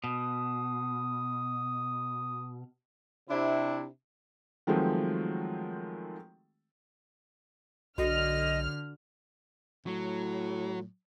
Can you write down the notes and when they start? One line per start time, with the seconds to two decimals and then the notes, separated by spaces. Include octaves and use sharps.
0.04 B2 D#6
3.29 C3 D4 E4
4.67 D#3 F3 F#3 G#3 A3 C4
7.98 B1 D3 F#4 A4 D#5 G5 F6
9.86 A2 F#3